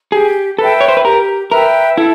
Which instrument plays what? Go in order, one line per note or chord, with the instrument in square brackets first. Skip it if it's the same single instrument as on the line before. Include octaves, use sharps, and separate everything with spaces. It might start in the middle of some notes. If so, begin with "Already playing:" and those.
[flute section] G4 [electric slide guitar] G#4
[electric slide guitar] A4 [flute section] B4 E5 G5
[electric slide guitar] C#5
C5
B4
[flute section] G4 [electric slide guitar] A#4
[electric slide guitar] A#4 [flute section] B4 E5 G5
[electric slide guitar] E4 [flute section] A4